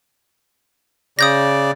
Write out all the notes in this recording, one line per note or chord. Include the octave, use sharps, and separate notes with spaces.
C#3 D5 D#6 G6 A#6